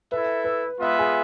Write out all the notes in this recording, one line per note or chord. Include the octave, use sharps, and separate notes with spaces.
E4 A4 B4 E5
B4
G#3 B3 F4 B4 E5
G#4